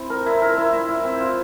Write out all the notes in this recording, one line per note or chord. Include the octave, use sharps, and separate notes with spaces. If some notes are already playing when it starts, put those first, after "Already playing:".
Already playing: C4 E4
A#4
E4
A#4
E4
E4
E4
C4
F4